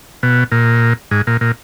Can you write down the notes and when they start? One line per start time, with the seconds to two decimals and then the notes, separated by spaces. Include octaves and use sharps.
0.23 B2
0.52 A#2
1.11 G#2
1.27 A#2
1.41 A#2